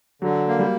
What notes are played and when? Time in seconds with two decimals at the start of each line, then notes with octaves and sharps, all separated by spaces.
0.22 D3 F#3
0.48 A#3
0.59 G3